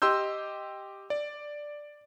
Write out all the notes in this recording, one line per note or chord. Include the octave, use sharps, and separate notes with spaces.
G4 D#5 C6 E6 G6
D5